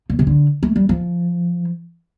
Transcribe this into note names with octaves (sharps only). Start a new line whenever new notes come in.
A#2
C3
D3
A3
G3
F3